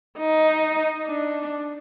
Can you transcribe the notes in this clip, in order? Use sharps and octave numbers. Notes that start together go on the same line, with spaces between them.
D#4
D4